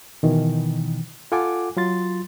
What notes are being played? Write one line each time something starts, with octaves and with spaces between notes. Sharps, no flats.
B2 D#3 E3
F4 A4 F#5 G#5 D6
F#3 F4 C6 A6